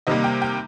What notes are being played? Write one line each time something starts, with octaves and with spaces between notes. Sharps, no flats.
C3 D#3 G3 A#3 D#5
G5
G5